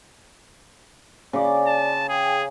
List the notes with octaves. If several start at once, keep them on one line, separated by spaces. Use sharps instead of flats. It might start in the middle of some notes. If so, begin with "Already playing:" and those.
C#3 D5 D6
A5
G#4 G5